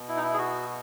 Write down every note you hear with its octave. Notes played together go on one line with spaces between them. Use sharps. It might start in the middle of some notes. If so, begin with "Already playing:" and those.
Already playing: B2
E4
D#4
E4
G#4
F#4